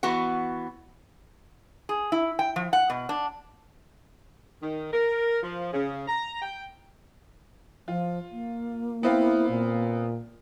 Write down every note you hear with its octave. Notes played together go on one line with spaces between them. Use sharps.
E3 B3 F#4 F#5
G#4
E4
G5
F3
F#5
B2
D4
D#3
A#4
F3
C#3
A#5
G5
F3 F4
A#3
B3 C4 E4 F5
A#2